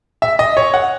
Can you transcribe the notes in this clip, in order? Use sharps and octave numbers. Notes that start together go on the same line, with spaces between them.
E5
D#5
C#5
F#5